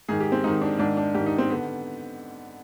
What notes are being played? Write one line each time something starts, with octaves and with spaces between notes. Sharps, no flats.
G#2 D#3 G#4
G4
C4
G#2 D#3 D#4
D4
G#2 D#3 D4
D4
G#2 D#3 G4
D#4
C4
D3 B3